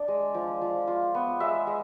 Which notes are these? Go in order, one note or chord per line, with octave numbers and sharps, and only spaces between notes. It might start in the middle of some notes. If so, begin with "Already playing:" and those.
Already playing: D4 D5
G#3
F3
F3
F4
B3
G#3 E5
G#3